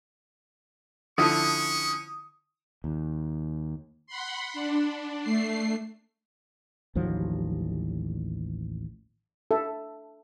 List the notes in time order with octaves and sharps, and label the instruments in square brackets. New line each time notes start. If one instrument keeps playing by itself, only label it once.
[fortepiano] D3 F3 E4 [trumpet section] C#4 C#6 [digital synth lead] D#6
[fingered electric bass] D#2
[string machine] F#5 B5 C6
D4
A3 C7
[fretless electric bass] A1 D#2 F3 F#3
[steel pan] A4 E5